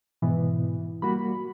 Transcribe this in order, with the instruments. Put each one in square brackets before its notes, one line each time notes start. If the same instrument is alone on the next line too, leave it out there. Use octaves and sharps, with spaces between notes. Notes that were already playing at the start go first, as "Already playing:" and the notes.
[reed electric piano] G#2 B2 B3 [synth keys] E3
[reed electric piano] G3 A#3 F#4 [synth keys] B5